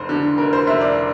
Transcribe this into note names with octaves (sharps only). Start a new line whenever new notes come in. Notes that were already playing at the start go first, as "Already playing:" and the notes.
Already playing: F1 C5
D3
F1 A#4
C5
F1 E5
D5